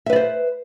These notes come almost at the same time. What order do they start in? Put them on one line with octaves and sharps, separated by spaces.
E5 B4 D5 C5